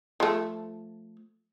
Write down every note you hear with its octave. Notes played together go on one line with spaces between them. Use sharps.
F3 A3